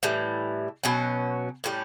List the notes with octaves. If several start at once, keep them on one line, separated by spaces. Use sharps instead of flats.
A2 E3 G3
B2 F#3 C#4
A2 G3 C#4